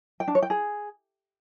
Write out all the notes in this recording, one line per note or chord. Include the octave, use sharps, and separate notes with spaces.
G5
D4
C#5
G5
G#4